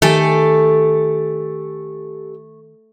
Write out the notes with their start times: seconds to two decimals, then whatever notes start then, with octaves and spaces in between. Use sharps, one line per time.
0.02 D#3 A3 G4 A4 G#5